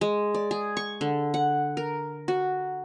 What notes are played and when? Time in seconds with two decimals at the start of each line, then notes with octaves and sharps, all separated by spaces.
0.01 G#3
0.34 D5
0.51 G#4
0.77 C#6
1.01 D3
1.34 F#5
1.77 A#4
2.28 F#4